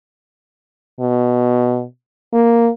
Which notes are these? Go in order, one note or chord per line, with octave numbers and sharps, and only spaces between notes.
B2
A#3